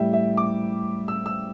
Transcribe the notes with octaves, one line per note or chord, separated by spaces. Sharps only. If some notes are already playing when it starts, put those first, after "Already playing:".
Already playing: A2 G3 E5 G5
E5
D6
E6
E6